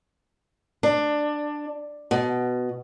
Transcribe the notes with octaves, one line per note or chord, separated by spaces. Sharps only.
D4
B2